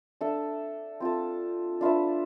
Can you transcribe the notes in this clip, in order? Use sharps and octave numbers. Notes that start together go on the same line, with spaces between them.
D4 A4 E5
C4 F4 A4
D4 F4 B4 E5